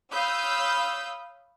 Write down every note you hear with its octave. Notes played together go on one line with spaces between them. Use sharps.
C#5 F5 B5 D#6 E6 G6